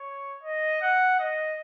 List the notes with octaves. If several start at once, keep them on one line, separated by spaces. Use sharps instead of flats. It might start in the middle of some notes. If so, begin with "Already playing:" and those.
Already playing: C#5
D#5
F#5
D#5